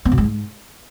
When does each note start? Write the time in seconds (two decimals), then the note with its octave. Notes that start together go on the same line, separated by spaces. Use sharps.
0.05 B3
0.12 B2
0.18 G#3
0.24 G#2